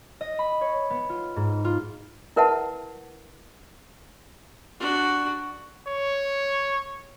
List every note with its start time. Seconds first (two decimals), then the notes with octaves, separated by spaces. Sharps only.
0.21 D#5
0.39 B5
0.61 C#5
0.90 B3
1.10 F4
1.36 G#2
1.65 F4
2.36 E4 A#4 B4 E5 F#5 A5
4.80 D4 F#4
5.87 C#5